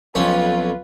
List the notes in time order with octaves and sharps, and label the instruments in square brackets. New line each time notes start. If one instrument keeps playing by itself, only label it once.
[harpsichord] B1 F2 C#4 [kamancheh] F4 B4